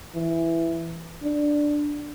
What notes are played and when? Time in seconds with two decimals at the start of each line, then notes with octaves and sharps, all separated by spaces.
0.15 E3
1.23 D4